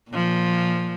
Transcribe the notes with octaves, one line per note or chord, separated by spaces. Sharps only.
A#2 F3